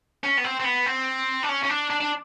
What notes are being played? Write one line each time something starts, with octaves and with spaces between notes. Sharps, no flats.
C#4
B3
C4
C4
B3
C4
D4
C#4
C#4
D4
D4
D4